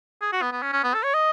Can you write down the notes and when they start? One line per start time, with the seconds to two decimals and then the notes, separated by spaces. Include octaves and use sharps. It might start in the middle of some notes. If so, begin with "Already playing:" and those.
0.21 G#4
0.33 F#4
0.42 B3
0.52 B3
0.62 C#4
0.73 C#4
0.84 B3
0.94 A4
1.03 C#5
1.14 D#5